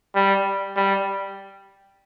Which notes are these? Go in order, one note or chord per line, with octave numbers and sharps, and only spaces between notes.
G3
G3